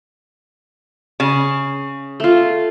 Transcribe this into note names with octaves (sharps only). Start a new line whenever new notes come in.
C#3
A3 F4